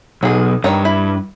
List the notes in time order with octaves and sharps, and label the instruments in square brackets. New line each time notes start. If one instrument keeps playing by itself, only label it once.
[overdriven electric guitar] B1 [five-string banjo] F#3 G#4
[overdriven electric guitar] G2 [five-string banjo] D#3 C#5 A#5
[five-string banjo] E4